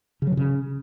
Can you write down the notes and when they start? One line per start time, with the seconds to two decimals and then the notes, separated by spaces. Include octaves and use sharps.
0.22 C#3
0.27 F#3
0.32 C3
0.37 C#3